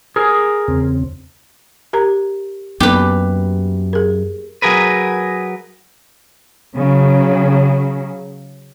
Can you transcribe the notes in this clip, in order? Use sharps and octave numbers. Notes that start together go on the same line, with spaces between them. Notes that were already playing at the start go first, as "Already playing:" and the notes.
G#4 A#4
E2 C#3 C4
G4 A#4 A#5
F#2 A#3 B3 D#4 G4 B4
G#4 A#4
F#3 G#4 A#4 B4
C#3 F#3